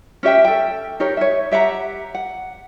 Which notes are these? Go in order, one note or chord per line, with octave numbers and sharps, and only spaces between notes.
C#4 G4 E5 G5
A4 G5
D#4 G4 A#4 C#5
C#5 E5
G4 E5 F#5 A#5
F#5